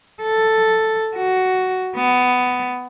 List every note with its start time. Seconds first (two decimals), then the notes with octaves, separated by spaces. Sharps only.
0.22 A4
1.16 F#4
1.96 B3